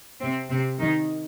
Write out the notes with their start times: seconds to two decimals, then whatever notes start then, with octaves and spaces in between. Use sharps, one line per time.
0.21 C3 C4
0.50 C3 C4
0.80 D#3 D#4